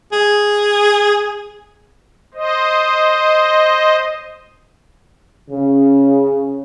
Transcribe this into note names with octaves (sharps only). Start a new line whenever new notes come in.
G#4
C5 D#5
C#3